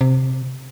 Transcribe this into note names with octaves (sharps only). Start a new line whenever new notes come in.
C3